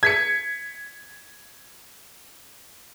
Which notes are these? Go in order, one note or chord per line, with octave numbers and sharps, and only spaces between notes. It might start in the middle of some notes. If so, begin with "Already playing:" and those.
G#6 B6 C#7